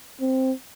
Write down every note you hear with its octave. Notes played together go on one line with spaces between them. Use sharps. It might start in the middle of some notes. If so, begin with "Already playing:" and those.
C4